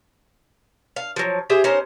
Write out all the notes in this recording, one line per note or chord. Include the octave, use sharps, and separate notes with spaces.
F5
F3 F#3
G4 G#4 C5 E5
C#4 D#4 A#4 C5